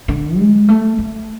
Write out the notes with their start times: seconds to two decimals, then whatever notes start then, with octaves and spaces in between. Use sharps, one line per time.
0.08 D3
0.37 G#3
0.68 A3
0.98 A3